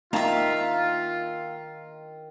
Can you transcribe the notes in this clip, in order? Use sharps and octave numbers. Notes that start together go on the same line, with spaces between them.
D#3 A#3 F4 E5 F5 A5 A#5